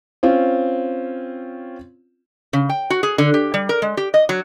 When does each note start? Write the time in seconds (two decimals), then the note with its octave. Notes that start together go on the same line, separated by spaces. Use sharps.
0.23 C4 C#4 F4
2.53 C#3
2.69 G5
2.90 F#4
3.03 G#4
3.18 D3
3.34 G4
3.54 G3
3.69 A#4
3.82 G#3
3.97 G4
4.14 D#5
4.29 F#3